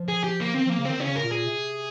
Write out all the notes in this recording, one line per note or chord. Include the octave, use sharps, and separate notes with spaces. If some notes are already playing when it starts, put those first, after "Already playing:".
Already playing: F3
G#4
G4
A#3
D#3 C4
F3 A#3
C#3
D#3 C4
C#3 C#4
A#4
A#2
G#4
C3